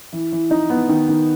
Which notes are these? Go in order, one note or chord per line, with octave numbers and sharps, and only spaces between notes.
E3
E3
D#4
B3
D#3
D#3